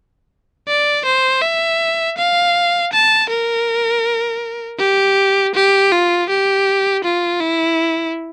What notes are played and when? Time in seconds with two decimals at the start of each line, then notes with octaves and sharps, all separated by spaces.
0.68 D5
1.06 C5
1.42 E5
2.18 F5
2.93 A5
3.30 A#4
4.79 G4
5.55 G4
5.92 F4
6.29 G4
7.04 F4
7.41 E4